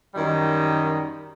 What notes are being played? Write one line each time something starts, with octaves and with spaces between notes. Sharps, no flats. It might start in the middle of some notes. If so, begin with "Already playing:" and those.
F#2 D#3 G3 D#5